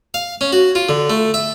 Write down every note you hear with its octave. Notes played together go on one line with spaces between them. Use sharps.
F5
C#4
F#4
F4
D3
A3
E5